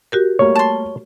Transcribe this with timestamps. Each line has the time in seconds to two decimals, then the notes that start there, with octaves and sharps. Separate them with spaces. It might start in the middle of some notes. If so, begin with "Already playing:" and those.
0.12 F#4 G4 A#4
0.39 G3 A3 A#3 C#5
0.56 A5 C6